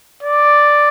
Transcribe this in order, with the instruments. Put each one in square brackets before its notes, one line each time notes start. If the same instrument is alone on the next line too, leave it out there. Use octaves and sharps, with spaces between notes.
[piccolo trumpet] D5